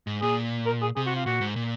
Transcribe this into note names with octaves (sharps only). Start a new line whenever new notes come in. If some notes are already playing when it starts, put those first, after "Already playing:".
G#2
A#2 G#4
A#4
G#4
C3 G#4
F#4
F4
A#2 F#4
G#2
A#2